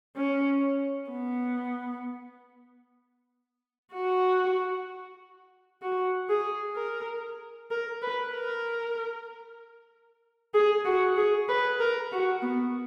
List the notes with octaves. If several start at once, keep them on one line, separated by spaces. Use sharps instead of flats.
C#4
B3
F#4
F#4
G#4
A#4
A#4
B4
A#4
G#4
F#4
G#4
B4
A#4
F#4
B3